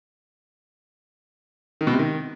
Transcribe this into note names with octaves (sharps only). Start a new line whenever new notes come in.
D#3
B2
C3
D#3